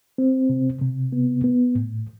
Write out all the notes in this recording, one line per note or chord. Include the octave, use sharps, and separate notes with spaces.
C4
C3
C3
B3
B3
A2